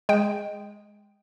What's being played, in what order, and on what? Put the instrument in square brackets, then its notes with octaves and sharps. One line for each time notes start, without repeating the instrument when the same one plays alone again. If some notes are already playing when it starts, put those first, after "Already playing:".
[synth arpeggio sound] G#3 G5